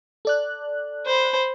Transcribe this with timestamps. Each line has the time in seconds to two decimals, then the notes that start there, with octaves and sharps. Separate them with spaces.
0.25 A4 D5 F#6
1.06 C5 B5